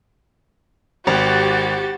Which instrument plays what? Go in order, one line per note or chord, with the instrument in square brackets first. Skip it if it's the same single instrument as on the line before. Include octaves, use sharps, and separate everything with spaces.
[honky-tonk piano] G#1 [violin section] F#4 G4 A6